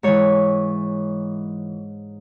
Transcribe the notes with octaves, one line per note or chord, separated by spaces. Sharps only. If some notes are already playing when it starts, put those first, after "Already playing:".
G#2 E3 C#5